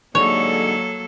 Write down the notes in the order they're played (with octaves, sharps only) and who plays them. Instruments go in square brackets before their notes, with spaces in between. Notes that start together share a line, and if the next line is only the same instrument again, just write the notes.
[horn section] G#2 D3 G3 [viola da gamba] F#3 A#3 A4 [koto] C#5